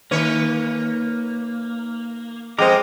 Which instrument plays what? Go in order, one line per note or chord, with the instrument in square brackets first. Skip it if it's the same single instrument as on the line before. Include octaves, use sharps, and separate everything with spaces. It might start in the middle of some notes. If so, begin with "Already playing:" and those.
[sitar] D#3 B4 C#5 [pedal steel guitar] A#3
[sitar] F2 [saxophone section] G#3 [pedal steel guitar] A#4 D#5 [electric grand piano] C5 G5 D6